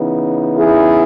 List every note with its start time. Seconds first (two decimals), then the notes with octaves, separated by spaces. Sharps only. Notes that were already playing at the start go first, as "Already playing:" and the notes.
Already playing: C#3 E3 B3 D#4
0.57 E4 G#4